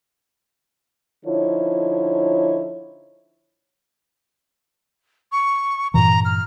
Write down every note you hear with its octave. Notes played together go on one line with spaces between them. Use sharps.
D3 F3 D#4 E4 C#5
C#6
G2 A#2 E3 A#5
F6